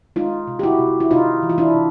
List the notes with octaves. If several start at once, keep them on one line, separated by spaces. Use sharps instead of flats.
G#3 D#4 F4
C3
G4
E4 F#4
C3
E4
C3 D#4 F4
E3
F4
D4 E4
C3